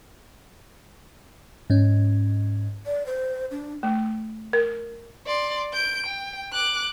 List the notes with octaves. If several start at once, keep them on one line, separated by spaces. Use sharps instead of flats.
G#2 C#4
D5
C5
D4
A3
A#4
D5 C6
G6 D7
G5
D6 F#6